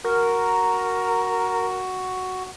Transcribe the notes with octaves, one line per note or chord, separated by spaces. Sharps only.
F#4 A#4